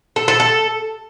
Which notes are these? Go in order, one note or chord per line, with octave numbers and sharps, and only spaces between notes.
A4
A4
A4